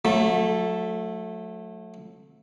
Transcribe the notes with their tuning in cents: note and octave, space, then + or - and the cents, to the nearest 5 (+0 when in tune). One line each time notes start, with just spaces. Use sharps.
F#3 -35 A3 +0